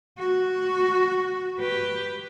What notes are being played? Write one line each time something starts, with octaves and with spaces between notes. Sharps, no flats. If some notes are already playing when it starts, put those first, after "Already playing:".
F#4
G4 B4